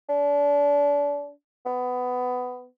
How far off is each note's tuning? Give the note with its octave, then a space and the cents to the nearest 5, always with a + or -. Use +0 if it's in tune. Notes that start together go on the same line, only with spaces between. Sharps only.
D4 -30
B3 +15